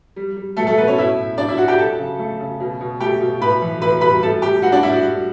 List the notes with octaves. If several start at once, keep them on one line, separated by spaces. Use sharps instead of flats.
G3
G3
B2 A3 A4
A3 A4
B2 B3 B4
C#4 C#5
A2 E4 E5
A2
A2 D4 D5
E4 E5
F#3 F#4 F#5
G4 G5
F#3 A4 A5
C#3
A3
C#3
B2
B2
A3 G4 G5
B2
A2 B4 B5
E3
A2 B4 B5
G3 B4 B5
A2 A4 A5
A3 G4 G5
A2 F#4 F#5
D4 D5
A2 E4
F#4
G3